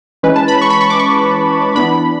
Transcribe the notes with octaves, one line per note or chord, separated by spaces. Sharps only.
E3 G#3 C#4 B4
A5
B5
C#6
B5
C#6
D6
C#6
E3 B3 D4 B5